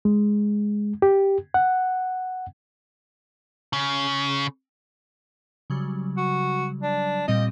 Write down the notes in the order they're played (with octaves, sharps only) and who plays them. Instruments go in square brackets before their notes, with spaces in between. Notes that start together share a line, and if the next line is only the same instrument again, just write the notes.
[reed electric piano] G#3
G4
F#5
[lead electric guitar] C#3
[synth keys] C#3 F#3 G3
[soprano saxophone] F#4
D4
[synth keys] A#2 G3 C4 [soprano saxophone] D#5